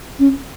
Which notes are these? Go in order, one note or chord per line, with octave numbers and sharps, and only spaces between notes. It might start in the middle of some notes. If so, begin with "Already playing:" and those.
C#4